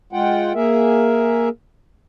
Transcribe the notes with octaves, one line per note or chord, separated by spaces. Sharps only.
G#3 F4 F#5 G5
A#3 G#4 A#4 E5